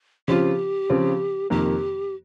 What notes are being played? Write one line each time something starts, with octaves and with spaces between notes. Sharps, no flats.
C#3 F3 C4 F4 G4
C#3 F3 C4 F4
F2 C3 D#3 A#3 G4